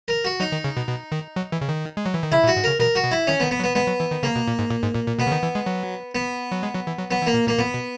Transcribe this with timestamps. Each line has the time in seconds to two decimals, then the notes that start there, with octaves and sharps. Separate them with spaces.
0.08 A#4
0.25 F#4
0.40 F#3 D#4
0.52 D#3
0.64 C#3
0.77 B2
0.88 B2
1.12 D#3
1.36 F#3
1.52 E3
1.61 C#3
1.69 D#3
1.97 G#3
2.06 F#3
2.14 E3
2.23 D#3
2.32 C#3 E4
2.44 A#2
2.47 F#4
2.56 G#2
2.64 C#3 A#4
2.79 B2 A#4
2.95 F#4
3.04 B2
3.11 E4
3.27 D#3 C#4
3.40 B3
3.43 D#3
3.51 B3
3.59 F#3
3.64 B3
3.75 G#3 B3
3.87 F#3
4.00 E3
4.11 D#3
4.23 C#3 A#3
4.36 B2
4.48 A#2
4.59 G#2
4.71 A#2
4.83 G#2
4.95 A#2
5.07 A#2
5.19 B2 B3
5.27 C#3
5.32 D#3
5.43 E3
5.55 G#3
5.66 F#3
6.15 B3
6.52 F#3
6.63 G#3
6.75 F#3
6.87 E3
6.98 F#3
7.10 F#3 B3
7.22 E3
7.27 A#3
7.34 A#2
7.47 A#2 A#3
7.58 A#2 B3
7.74 B2